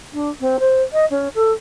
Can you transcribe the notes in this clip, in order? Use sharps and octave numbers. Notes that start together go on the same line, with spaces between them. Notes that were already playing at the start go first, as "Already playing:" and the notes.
D4
C4
C5
D#5
C#4
A4